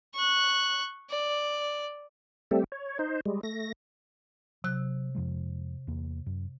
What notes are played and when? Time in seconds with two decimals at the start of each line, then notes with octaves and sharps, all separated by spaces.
0.14 C#6 F#6
1.10 D5
2.51 G3 A3 C4 G4 A4
2.72 C#5
2.99 D#4 C5
3.26 G3 G#3
3.43 A3 A#6
4.64 C3 F#3 F#6
5.15 F2 F3 G#3
5.87 E2 A#3
6.26 F#2